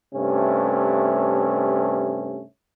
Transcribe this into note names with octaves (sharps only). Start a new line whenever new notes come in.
G2 C3 A3 C#4